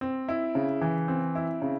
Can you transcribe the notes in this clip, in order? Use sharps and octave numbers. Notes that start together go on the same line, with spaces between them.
C4
E4
C#3
E3
C4
E4
C#3